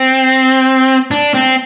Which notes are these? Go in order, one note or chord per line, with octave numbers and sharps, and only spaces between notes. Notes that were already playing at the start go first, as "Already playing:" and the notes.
Already playing: C4
D4
C4